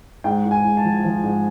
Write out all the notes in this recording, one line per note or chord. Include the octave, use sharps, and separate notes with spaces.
G#2 G5
G#2
G#5
G#2
A5
F3
F3
G#2